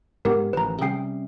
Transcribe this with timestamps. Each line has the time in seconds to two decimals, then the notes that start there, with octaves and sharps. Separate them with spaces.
0.25 G#2 B3 G4 A#4
0.53 A1 D#3 F3 B4 A#5
0.81 C3 G3 C#4 G#4 G5 C7